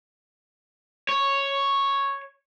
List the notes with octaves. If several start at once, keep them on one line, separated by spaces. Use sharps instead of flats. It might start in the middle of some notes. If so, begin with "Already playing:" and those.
C#5